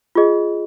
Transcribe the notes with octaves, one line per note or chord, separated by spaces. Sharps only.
F4 G#4 D#5